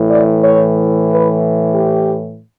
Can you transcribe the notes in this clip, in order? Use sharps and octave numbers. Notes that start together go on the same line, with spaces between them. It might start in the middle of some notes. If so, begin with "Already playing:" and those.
Already playing: A2 E3
D5
C#5
B4
G4